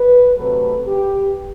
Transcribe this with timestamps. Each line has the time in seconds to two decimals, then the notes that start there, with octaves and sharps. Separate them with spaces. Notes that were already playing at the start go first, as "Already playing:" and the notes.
Already playing: B4
0.35 C3 F#3 A3 B4
0.86 G4